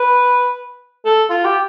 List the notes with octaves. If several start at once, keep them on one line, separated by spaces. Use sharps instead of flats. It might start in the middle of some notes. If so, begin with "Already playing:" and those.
Already playing: B4
A4
F4
G4